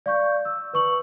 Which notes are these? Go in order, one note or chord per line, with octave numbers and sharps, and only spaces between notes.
D5 F5 C#6 G6
E6
B4 C#6 F#7